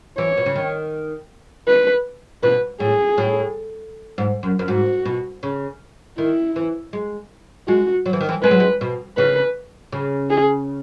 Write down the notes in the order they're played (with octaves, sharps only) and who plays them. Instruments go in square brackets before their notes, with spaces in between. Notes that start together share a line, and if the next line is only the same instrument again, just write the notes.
[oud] E3 [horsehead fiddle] C#5
[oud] B2
C#3
D#3
[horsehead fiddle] B4
[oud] B2 [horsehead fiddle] B4
[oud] A2 [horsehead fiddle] G#4
[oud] A2
G#2
F#2
F#2
[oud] G#2 [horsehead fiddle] F#4
[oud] B2
C#3
[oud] D#3 [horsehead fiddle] E4
[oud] E3
G#3
[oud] G#3 [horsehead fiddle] F#4
[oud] F#3
E3
D#3
E3
[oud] G#3 [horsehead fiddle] B4
[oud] F#3
G#3
B2
[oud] C#3 [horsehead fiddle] B4
[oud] C#3
[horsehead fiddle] G#4